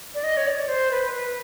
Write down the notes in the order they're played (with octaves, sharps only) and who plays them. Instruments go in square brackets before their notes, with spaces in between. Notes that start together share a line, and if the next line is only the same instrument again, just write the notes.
[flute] D5
D#5
C#5
D5
C5
B4
B4